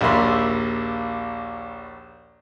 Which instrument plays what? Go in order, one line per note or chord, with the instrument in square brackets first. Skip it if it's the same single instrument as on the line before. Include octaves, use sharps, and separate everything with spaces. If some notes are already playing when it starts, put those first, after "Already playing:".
[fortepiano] A#1 D#2 A#3 E5 B5 C6